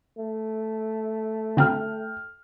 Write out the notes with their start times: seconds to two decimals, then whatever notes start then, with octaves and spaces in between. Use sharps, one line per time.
0.17 A3
1.57 D3 C4 G5 F6